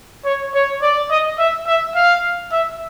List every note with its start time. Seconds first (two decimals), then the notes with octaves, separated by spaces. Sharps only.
0.25 C#5
0.54 C#5
0.82 D5
1.10 D#5
1.38 E5
1.67 E5
1.95 F5
2.52 E5